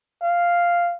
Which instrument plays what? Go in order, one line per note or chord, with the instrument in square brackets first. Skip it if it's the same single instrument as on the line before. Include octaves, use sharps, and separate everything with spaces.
[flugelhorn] F5